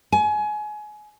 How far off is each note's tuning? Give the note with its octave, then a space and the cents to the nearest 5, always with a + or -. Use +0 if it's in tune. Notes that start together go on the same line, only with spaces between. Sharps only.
G#5 +25